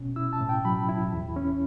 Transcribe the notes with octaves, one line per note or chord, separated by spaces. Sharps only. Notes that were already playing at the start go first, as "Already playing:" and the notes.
Already playing: B2 C#4
E4 E6
A5
A2
G5
F#3 B5
E4
E2
C#4